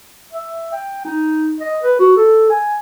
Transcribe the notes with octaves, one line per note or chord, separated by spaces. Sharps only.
E5
G5
D#4
D#5
B4
F#4
A4
G#5